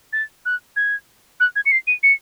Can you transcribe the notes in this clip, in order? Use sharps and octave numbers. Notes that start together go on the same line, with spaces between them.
A6
F#6
G#6
F#6
G#6
C#7
C7
D#7
C#7